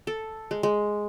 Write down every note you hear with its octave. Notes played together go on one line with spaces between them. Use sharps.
A4
G#3
G#3